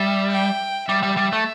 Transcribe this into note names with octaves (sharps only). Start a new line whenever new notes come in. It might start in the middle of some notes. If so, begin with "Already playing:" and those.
Already playing: G3 E5
G5
G3 E5
G3
G3
A3